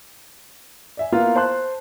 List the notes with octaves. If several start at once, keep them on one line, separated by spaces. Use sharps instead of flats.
D5 E5 G#5
A#3 B3 E4 F4 F5
C5 A5 C6 F#6